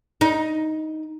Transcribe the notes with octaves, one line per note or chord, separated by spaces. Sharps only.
D#4